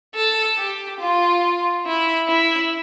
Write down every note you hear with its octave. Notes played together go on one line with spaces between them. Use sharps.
A4
G4
F4
E4
E4